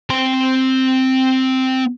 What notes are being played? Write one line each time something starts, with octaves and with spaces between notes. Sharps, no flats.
C4 C6